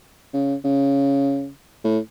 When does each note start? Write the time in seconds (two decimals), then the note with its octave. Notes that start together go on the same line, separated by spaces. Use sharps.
0.34 C#3
0.64 C#3
1.84 A2